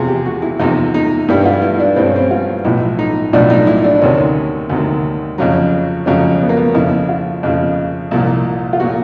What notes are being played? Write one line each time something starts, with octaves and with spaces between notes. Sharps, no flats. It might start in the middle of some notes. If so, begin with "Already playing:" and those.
Already playing: E2 C3 F3 G#4
G4
F#4
E4
E2 C3 F3 D#4
D#4
G2 E3 G3
F4
E4
D4
G2 E3 G3 C4
C#4
C4
F4
B1 A2 F3 E4
D#4
B1 A2 F3 D4
D#4
E4
D4
D4
D2 C3 D#3 C#4
D2 C3 D#3
F2 C#3 F#3
F2 C#3 F#3 C#4
B3
A#3
B3
F2 C#3 F3 E4
F4
F2 C#3 F3
C2 A#2 F3
F4
A#2 F3 F#4